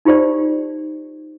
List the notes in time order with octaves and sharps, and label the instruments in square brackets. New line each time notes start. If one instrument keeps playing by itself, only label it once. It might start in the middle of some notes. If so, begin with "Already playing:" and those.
[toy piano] D#4 F4 G4 C5 D5